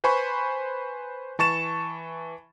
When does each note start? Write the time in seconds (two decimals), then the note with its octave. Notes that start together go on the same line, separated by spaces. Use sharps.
0.04 B4 C5 G#5 B5 C#6
1.39 E3 A5 C#6 A6 E7